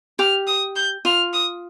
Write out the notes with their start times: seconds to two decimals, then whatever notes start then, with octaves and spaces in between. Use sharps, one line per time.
0.19 G4 F6
0.47 D#6
0.76 G6
1.05 F4 F6
1.33 D#6